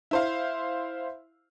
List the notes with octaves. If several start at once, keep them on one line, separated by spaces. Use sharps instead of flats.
E4 C5 F5